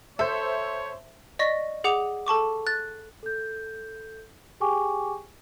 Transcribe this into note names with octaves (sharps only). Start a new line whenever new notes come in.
A4 C5 C#5 E5
D5 D#5 C#6 A#6 B6
G#4 F#5 D6 F7
A4 A5 C#6 D6
F#6 A6
A4 G6
G4 G#4 G5 G#5 C#6 D6